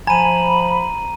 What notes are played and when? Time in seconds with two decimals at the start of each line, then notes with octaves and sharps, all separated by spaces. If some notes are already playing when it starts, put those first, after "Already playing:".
0.07 F3 G#5 A#5 B5 D#7